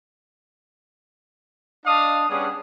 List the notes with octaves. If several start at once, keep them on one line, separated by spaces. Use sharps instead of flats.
D4 D5 D#5 F5 A5 D#6
G3 B3 C#4 D4 G#4